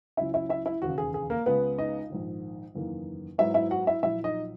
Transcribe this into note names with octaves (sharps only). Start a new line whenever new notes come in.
C#2 C#3 F#3 C#4 E4 E5
E4 E5
E4 E5
E4 E5
E1 D#2 C#3 F#4
G#4
G#4
A#3 A#4
C#2 C#3 G#3 B3 B4
D#4 D#5
A#1 G#2 D#3
F#1 E2 D#3 A#3
G#2 F#3 B3 E4 E5
E4 E5
F#4 F#5
E4 E5
A#1 A#2 F#3 E4 E5
D#4 D#5